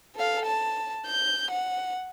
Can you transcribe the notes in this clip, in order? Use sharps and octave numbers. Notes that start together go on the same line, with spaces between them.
A4 F5
A5
G6
F#5